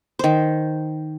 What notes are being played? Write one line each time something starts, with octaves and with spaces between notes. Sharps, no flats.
D#3 C5